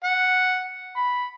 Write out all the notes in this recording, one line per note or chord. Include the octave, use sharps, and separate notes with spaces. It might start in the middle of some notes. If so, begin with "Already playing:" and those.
F#5
B5